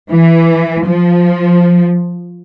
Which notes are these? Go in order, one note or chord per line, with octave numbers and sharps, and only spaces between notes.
E3
F3